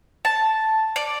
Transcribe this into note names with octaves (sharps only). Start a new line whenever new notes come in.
A5
D5